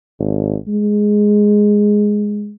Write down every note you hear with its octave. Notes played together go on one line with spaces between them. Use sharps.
G#1
G#3